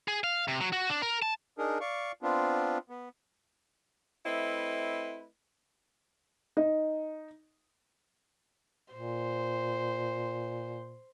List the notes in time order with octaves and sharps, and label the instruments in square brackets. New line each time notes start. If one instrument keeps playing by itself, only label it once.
[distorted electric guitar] G#4
F5
C3
F#3
F#4
D4
A#4
A5
[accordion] D4 D#4 G#4 A#4
D5 F5 C#6
B3 C4 D4 F4
B3
[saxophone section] A3 C4 E4 B4 D#5
[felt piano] D#4
[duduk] A#2 [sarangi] C5